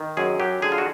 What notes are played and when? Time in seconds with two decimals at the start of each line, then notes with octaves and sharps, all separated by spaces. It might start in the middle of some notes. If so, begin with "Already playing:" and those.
Already playing: D#3
0.17 F#2 G#4
0.40 F#3 G4
0.62 D3 G#4
0.72 F4
0.78 F#4